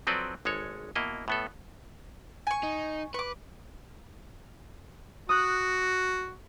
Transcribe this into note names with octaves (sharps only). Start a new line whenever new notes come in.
F3 F#3 C4 A4 B4 D5
G#1 G#3 A4 C#5
B2 A#3 E4 D#5
A2 B3 A4
G#5 C#6
D#4
B4 C#6 D6
F#4 D#6 F#6